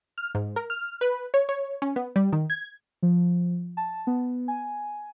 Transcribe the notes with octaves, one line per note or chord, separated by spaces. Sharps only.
F6
G#2
A#4
F6
B4
C#5
C#5
C#4
B3
G3
D#3
G#6
F3
A5
B3
G#5